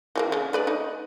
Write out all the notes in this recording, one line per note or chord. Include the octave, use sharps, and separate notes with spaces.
E3 G3 A#3
C#3
A3 B4 D5
D#4